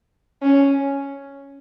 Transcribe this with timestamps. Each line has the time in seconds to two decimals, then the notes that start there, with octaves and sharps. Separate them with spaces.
0.42 C#4